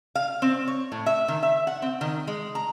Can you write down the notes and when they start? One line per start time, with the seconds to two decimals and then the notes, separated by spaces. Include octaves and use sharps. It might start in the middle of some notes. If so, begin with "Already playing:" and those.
0.15 F5
0.42 C4
0.67 C#5
0.92 A2
1.06 E5
1.28 D#3
1.43 E5
1.67 F#5
1.82 C4
2.01 D#3
2.27 G#3
2.55 A#5